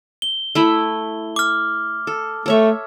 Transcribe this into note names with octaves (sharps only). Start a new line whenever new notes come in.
G7
A3 E4 B5
D6 F6
A4
A3 A4 C#5 E5